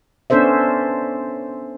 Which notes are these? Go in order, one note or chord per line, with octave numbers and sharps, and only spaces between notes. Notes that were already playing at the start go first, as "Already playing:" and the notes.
B3 C#4 D4 A4 C5 E5